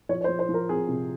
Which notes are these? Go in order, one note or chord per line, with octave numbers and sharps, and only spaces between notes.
F3 C#5
C#5
C5
F3
C5
F3
A#4
C4 G#4
C3